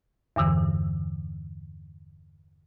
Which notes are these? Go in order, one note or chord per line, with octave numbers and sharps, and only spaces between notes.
E2 G2 D3 E3